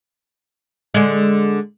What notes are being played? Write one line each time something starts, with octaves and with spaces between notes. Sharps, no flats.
D3 G#3